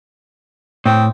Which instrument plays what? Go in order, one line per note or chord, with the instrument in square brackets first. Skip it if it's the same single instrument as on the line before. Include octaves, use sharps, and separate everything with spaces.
[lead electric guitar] A2 [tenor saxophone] C4